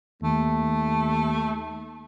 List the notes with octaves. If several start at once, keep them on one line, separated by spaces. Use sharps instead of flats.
D#2 A3